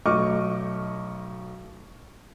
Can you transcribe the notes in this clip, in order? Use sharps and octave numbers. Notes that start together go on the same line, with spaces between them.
B1 A3 D#5 C#6 D6 F6